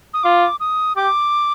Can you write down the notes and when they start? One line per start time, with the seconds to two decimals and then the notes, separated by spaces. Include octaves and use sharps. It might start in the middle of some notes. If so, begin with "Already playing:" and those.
0.14 D#6
0.23 F4 D6
0.60 D#6
0.96 G4 D6